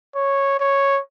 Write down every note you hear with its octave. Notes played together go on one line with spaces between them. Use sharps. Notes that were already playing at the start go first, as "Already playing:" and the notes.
C#5
C#5